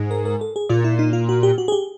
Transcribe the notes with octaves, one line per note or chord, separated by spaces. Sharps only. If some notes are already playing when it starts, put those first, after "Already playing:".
Already playing: G#2
A#4
A#4
A4
G#4
A#2 F4
E4
D#4
F4
F#4
G4
F#4
G#4
G4